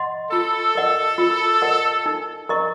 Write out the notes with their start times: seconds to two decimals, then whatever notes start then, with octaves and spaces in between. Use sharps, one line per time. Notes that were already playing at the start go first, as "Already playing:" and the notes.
Already playing: D#5 F#5 C6
0.31 F4 A4
0.75 A#4 D#5 F#5
1.18 F4
1.62 A#4 D#5 F#5
2.06 D#4
2.49 A#4 D#5 A#5 C#6